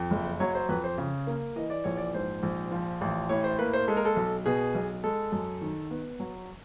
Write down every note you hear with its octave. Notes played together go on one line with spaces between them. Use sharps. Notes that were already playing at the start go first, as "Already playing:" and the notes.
Already playing: F2
F#1
F#3 C#5
C5
F2 B4
C5
C#3
A#3
E3 D#5
D5
A#1 C#5
D5
G#2 C5
A#1
F3
A1
A2 C#5
C5
A#3 B4
C5
G#3 A4
A#4
A4
B1
B2 G#4
B1
G#3 A4
F#2
D#3
B3
F#3